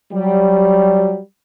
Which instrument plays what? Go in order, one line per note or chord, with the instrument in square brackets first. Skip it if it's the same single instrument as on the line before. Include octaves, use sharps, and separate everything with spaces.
[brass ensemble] F#3 G3